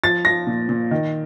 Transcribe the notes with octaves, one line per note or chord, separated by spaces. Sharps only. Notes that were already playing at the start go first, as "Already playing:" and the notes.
F3 A6
F3 A#6
A#2
A#2
D#3